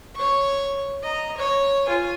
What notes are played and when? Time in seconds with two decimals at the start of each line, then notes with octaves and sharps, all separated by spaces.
0.15 C#5 C#6
1.02 D#5 A#5
1.37 C#5
1.86 F4 G#5